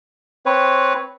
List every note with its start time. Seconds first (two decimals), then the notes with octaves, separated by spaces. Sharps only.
0.46 C4 B4 C#5